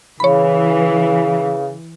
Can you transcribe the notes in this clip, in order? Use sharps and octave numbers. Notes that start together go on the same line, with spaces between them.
C#3 E3 C#5 B5